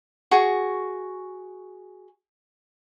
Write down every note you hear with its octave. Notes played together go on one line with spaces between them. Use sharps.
F#4 G#4 C#6